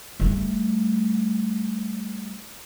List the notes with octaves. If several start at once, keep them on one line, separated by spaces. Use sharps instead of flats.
G3 A3